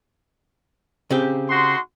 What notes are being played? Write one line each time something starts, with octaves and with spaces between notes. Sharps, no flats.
C#3 C4 G4
D#4 F#4 C6